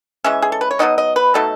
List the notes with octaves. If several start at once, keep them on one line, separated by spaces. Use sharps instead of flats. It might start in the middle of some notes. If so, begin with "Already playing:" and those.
E3 G#3 C#4 E5
G#4
A4
B4
C#5
B2 F#3 B3 D#4 D#5
D#5
B4
B2 F#3 A3 D#4 A4